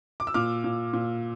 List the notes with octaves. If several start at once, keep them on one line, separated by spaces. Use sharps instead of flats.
D6
E6
A#2 D6 F6
A#2
A#2